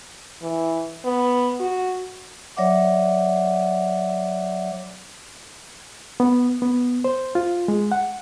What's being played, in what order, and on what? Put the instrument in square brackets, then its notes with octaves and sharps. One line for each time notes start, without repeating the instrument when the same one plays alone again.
[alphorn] E3
B3
F#4
[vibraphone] F#3 C#5 D5 E5 F#5 D6
[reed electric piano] B3
B3
C5
F4
G#3
F#5